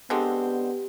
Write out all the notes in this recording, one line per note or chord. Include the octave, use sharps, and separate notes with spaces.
D3 G#3 B3 C4 G4